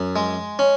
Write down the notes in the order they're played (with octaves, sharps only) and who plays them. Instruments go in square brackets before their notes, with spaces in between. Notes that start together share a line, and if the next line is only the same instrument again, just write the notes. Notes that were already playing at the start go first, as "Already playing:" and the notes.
Already playing: [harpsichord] F#2
G#3
C#4